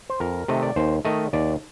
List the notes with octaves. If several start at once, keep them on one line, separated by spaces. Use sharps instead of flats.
C5
F2 A#4
C3 D#3 A3 D#5
D5
D#2 C5
D#3 A3 D#5
D#2 D5